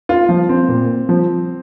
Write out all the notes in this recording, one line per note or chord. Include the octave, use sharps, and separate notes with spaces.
F4
F3
C4
A#2
F3